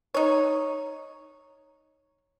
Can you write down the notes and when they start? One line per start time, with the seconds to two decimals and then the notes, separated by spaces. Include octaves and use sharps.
0.14 D#4 C#5